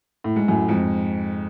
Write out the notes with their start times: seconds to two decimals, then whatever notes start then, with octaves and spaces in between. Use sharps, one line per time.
0.24 A2
0.36 G#2
0.48 F#2 A2
0.69 F2 G#2